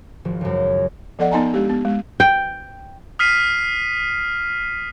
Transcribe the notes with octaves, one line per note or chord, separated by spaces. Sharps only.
G#1 F3 F#4
C#2 F#2
F3 B3 A4 D5 D#5 F#5
B3 D#4 D#5 G#5 A#5
G#3 D4 G4
B3
G#3
G5
D#6 F6 B6 C7 D#7